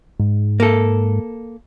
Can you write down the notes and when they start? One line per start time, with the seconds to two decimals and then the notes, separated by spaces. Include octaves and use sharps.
0.20 G#2
0.60 A#3 A4